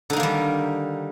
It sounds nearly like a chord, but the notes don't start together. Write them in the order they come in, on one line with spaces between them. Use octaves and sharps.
D3 D#4 A#3 D#3 G3